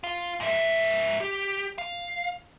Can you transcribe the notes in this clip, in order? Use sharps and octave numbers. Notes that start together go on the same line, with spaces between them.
F4
G#2 E5
G4
F5